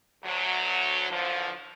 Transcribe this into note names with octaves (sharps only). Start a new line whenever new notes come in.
D2 F#3
F#2 D3 E3 F3